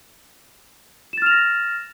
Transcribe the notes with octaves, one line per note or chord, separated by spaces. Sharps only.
F6 A6 A#6 E7 F7